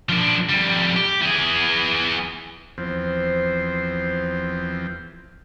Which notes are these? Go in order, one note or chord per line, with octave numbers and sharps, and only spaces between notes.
F3 D4
F2 G3
G4
E3 G#4
E2 F3 C4 C5